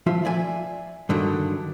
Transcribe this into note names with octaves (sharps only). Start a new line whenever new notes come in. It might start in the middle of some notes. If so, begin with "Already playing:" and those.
F3 F4 E5
D5 E5 G#5
G2 D3 D#3 F#3